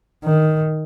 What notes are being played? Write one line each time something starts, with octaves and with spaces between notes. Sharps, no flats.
D#3